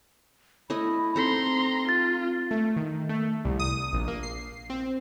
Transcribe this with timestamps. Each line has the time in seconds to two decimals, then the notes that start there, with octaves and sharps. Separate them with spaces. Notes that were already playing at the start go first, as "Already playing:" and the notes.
0.70 A3 E4 D#5 B5
1.16 C4 D#4 A4 A#5 C6
1.89 F4 A6
2.51 A3
2.76 D#3
3.09 A3
3.45 C2
3.60 D#6
3.93 A#1
4.08 A#3
4.23 C7
4.70 C4